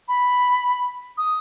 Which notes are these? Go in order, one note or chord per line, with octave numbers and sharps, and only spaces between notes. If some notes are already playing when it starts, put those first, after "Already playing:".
B5
D#6